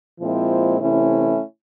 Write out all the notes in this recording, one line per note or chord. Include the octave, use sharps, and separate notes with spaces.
A#2 F3 G#3 C4 E4
C3 E3 A3 C#4 E4